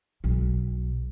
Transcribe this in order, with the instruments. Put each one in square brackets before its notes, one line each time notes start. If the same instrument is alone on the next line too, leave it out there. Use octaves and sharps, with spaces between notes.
[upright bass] B1